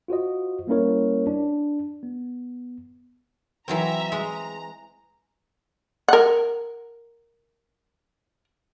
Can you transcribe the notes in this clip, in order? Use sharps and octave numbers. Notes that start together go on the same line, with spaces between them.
F4 F#4 C5 D#5
G3 A#3 C#4 E4 A#4 C#5
D4
B3
E3 F#3 C4 E5 A#5
G#3 A#5
A#4 F#5